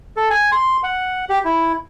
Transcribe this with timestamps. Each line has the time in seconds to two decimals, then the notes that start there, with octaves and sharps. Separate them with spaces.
0.17 A4
0.30 G#5
0.52 C6
0.83 F#5
1.29 G4
1.45 E4